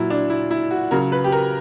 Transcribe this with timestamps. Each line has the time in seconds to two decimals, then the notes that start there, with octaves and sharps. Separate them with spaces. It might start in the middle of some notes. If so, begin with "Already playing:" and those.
Already playing: A#2 F#3 E4
0.10 D4
0.30 E4
0.51 E4
0.71 F#4
0.91 C#3 F#3 A#4
1.12 B4
1.24 G4
1.32 A#4